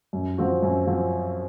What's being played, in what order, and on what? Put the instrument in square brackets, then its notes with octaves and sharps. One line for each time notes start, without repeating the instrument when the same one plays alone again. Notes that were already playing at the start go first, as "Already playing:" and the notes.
[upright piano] F#2
F3 C4 F#4
F#2
F3 C4 F#4